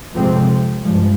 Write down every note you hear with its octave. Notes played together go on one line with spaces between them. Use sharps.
F2 C3 F3 G#3 C4
G2 F3 G#3